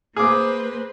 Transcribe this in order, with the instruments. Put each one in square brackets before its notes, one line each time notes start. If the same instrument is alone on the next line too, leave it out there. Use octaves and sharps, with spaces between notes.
[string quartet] A#3 B4 C5 [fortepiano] G#4 D6